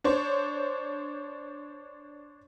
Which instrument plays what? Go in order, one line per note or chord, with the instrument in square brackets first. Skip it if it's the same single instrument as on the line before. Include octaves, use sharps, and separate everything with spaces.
[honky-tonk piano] D4 C5 C#5